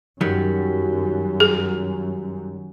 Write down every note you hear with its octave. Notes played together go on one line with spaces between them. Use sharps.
F#2 D#3 F#3 G3
G#4